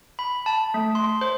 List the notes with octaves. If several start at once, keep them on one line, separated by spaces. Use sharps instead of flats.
B5
A5
A3
C6
C5